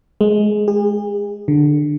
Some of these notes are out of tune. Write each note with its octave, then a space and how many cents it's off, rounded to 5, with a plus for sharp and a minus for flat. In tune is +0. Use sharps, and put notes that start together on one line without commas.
G#3 +15
G#4 -40
D3 +10